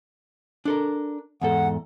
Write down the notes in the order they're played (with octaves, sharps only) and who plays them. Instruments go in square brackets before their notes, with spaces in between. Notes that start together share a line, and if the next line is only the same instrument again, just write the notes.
[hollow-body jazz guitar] D4 A4 A#4
[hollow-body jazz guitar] E2 G#2 A4 [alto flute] F#5